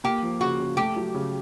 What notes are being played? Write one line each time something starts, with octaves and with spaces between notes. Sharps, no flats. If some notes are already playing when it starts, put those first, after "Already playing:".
A#3 G4
F3
C#3 F#4
C#3
A3 G4
F#3
C#3